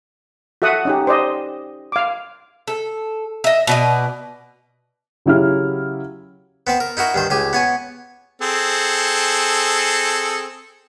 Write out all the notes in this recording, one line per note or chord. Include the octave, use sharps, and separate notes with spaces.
F#4 A4 E5 F#5 D#6
C#4 D#4 G4
C5 D5 D#5
F5 D6
A4
D#5 E5
B2 D5 D#5
C#3 F#3 E4 G4 F6
B3 C4 B4
A#4
D#4 E4 F#4 A#4
G2 D#3 C5
C#2 G4 G#5
B3 C#5 G#5
C4 G#4 A4